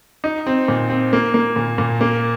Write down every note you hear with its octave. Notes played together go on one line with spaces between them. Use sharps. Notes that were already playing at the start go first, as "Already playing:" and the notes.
D#4
C4
A#2
C4
A#3
A#3
A#2
A#2
A#3